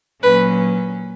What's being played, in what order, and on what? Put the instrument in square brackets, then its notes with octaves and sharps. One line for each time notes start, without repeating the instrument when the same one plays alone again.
[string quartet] A#2 F#3 C#4 B4